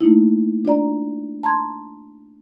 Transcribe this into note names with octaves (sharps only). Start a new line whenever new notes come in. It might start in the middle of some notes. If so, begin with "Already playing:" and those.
A3 A#3 D#4 E4
D4 F4 D5 A#5
A5 A#5 C6 G#6